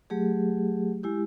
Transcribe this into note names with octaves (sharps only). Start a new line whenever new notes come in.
F#3 A3 G4 G#4
G#3 E4 G4